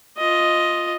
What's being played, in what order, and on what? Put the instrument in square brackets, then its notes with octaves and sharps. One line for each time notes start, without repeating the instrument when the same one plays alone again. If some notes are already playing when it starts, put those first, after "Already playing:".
[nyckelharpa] F4 D#5